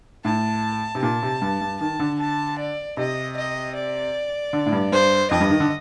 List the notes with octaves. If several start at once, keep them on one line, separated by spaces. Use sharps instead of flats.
A2 A5
C3
A#2 A5
C3
G2
G2
D#3 A5
D3
A5
D5
C3 D#5
D#5
D5
D3
A2
G2
G2 C5
F2 D#5
G2
D#3
D3